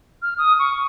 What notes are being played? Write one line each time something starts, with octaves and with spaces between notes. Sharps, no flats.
F6
D#6
C#6